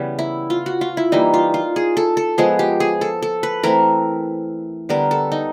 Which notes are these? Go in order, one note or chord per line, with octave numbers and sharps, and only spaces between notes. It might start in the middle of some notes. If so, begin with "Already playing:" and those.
Already playing: C#3 E3 G3 B3
E4
F4
F#4
F4
E4
E3 G3 A#3 D#4
F4
F4
G#4
A4
A4
F3 G#3 B3 G#4
G4
G#4
A4
A4
B4
E3 A3 C4 A#4
D3 G3 B3 A#4
A4
D#4